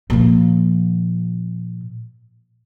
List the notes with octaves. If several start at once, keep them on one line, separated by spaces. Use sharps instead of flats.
A#2 F3